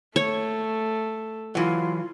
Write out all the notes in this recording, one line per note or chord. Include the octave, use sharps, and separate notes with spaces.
A3 C#5
E3 F#3 F4